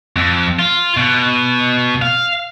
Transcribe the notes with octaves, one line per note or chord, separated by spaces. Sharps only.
F2
F4
B2
F5